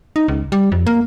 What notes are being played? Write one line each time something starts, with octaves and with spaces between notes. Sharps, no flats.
D#4
C#2
G3
F2
A#3